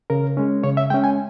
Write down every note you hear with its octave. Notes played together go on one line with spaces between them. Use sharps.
C#3 A#4
G#3 C#4
C#3 C#5
E5
G#3 C#4 G5
G#5